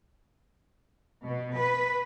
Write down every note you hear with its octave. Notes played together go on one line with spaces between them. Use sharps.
B2
B4